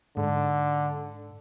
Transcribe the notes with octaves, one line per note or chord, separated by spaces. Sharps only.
G#2 D3